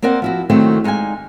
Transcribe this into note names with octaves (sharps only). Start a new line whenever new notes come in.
A#3 C4 A#4 D5 F#5
F3 E4 F#4
D#3 F#3 A3 A#3 C4 E4
G#3 D#4 D5 F5 G#5